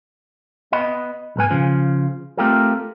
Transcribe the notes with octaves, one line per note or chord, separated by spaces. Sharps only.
B3 D#5 B5
B1 G#2 B4 G#5
C#3 F3
A3 C4 F4 G4 A4 A#4